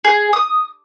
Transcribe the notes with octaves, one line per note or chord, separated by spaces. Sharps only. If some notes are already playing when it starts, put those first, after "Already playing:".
G#4
D#6